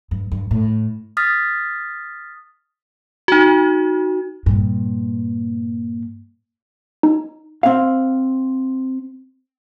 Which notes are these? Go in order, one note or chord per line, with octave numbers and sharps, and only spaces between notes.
G2
G2
A2
D#6 F6 A6 B6
D#4 F#4
G2 A#2
D#4
C4 F5